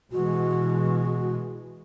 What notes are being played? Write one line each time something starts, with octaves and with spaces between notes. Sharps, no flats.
B2 E3 G#3 F#4